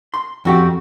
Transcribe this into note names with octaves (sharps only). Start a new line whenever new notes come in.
C6
F2 F#4 G4